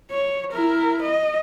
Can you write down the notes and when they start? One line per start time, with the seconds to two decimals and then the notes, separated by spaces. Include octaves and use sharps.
0.11 C#5
0.52 E4 A#4
1.02 D#5